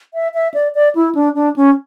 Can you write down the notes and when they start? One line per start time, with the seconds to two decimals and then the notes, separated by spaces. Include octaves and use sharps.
0.14 E5
0.34 E5
0.54 D5
0.75 D5
0.95 E4
1.15 D4
1.35 D4
1.56 C#4